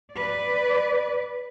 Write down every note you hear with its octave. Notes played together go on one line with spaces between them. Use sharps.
B4 D5